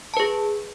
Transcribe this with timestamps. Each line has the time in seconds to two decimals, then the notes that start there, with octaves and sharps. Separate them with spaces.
0.14 A5
0.17 B4
0.20 G#4